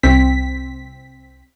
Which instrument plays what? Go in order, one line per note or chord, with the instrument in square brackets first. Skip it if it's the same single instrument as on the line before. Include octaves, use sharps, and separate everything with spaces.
[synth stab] C2 C4 B6